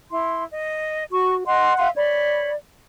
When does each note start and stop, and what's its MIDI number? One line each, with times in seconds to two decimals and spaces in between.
0.11 0.44 64
0.11 0.44 84
0.53 1.04 75
1.11 1.44 66
1.11 1.34 85
1.47 1.73 75
1.47 1.88 78
1.47 1.73 84
1.78 1.90 76
1.78 1.90 77
1.78 1.90 84
1.96 2.51 73
1.96 2.56 74
1.96 2.51 83